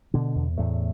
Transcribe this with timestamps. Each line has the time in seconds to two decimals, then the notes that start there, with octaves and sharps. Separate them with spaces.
0.14 B2 D3 D4
0.35 E2
0.57 E2 A2 A3